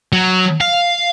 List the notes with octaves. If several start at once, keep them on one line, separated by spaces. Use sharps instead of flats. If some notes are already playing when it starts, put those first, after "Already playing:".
F#3
F5